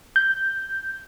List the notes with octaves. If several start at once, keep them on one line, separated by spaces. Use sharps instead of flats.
G6